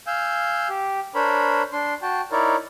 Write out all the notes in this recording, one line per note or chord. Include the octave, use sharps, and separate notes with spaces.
F5 G#5 E6 G6
G4
D4 A#4 C5 C#5 B5
D4 C6
F#4 G5 A5
D#4 E4 A#4 C#5 D5